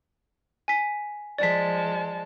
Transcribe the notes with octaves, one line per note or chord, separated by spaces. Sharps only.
G#5 B6
F3 G#3 D5 A5 B6